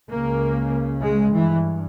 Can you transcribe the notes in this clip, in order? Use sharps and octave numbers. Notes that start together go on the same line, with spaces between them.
C#2 C#3 A#3
G#3
G2 E3